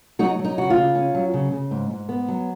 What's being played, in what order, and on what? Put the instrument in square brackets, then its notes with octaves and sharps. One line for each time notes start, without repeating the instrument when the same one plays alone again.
[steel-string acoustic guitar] F#3 D#4 F#4
F#3
D#4
C#3 F#4
F4
C#3
C#4
F#3
C#3
C#3
G#2
G#2
B3
F#3